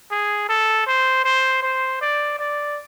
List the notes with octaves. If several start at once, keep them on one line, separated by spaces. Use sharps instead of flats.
G#4
A4
C5
C5
C5
D5
D5